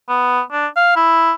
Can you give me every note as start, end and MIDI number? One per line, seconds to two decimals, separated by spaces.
0.09 0.41 59
0.52 0.67 62
0.76 0.93 77
0.96 1.32 64